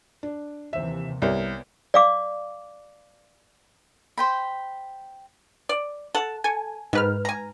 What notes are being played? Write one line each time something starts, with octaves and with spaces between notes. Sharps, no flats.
D4
D#2 C3 E3 C5 E5
C2 B3 A#4 C#5 D5
D5 F5 D6
C5 G5 B5
D5
A4 F#5 A5
A4 G#5
G#2 D#3 B4 F6
G#5 A#5